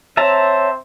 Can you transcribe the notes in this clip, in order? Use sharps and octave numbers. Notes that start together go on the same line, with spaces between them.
C4 C5 C#5 E5 A5 A#5